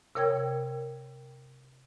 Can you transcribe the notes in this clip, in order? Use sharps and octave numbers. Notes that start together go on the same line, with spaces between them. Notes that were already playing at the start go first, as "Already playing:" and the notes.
C3 A#4 C#5 G5 G#6